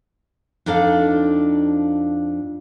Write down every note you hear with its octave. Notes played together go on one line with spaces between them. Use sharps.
F2 D4 D#4 A4 F5